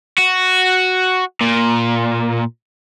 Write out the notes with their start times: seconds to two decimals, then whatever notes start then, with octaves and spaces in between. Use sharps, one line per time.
0.18 F#4
1.41 A#2